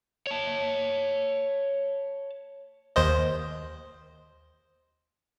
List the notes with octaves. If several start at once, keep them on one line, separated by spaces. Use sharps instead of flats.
C#5 A5
D#2 C5 D#5